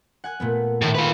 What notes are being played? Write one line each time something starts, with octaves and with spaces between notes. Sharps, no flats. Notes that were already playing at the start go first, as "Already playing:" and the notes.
F#5 G#5 F#6
A#2 A3 B3
A2 D#3 A3
F4 B4